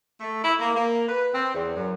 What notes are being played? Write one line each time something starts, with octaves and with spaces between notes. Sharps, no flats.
A3
E4
A#3
A#3
B4
C4
E2
F#2